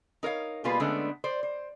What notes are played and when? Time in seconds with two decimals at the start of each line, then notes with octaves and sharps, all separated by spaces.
0.23 D#4 A#4 C#5 F5
0.64 B2 G3 A#3 F4 G#4 B4
0.80 D3 G#3 A3 B3 C#4 D4
1.24 C5 D5
1.43 C5